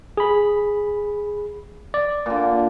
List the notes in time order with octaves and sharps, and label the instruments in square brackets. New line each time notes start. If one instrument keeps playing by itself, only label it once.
[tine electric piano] G#4 B5
D5
[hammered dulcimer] A#2 D3